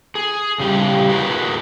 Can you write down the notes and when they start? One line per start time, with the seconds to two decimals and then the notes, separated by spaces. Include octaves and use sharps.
0.15 G#4
0.60 C#3 G3 G4
1.09 F#4 G#4 A#4 B4